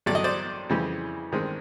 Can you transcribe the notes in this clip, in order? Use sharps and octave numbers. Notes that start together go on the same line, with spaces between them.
A1 G2 D3 F#3 D5
D#5
C5 D5
F2 C#3 E3 G3 C4
A1 G2 D#3 G#3 C4